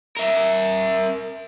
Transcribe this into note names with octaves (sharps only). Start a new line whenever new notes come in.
A#4 E5